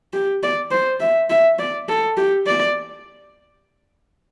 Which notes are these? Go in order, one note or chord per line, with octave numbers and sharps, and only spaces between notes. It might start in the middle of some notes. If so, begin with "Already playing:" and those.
G4
D5
C5
E5
E5
D5
A4
G4
D5